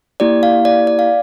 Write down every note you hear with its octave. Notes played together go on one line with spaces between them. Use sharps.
A#3 E4 G4 D5
F5
D5
D5
F5